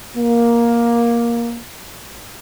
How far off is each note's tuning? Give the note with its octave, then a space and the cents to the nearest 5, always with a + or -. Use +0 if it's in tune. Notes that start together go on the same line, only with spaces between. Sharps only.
A#3 +10